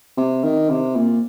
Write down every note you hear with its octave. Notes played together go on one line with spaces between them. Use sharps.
C3
D#3
C3
A#2